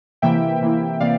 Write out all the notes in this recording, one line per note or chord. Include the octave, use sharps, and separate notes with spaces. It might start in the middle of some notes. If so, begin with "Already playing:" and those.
C3 E3 A#3 E4 E5 G5
C3 E3 A#3 E4
C3 E3 A#3 D5 F5